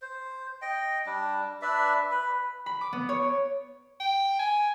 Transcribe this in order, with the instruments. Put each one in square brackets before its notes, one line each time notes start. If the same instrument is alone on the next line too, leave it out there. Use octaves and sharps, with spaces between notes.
[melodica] C5
D#5 G5
G3 D4
D4 B4 D5 E5
B4
[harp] B5
D6
B3
C#5
[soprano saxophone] G5
G#5